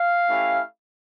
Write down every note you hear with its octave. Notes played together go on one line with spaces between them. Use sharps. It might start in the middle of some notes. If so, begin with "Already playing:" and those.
Already playing: F5
A3 C#4 E4 G4